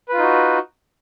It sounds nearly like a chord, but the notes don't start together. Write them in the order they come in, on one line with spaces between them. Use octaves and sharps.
B4 F4 D#4 F#4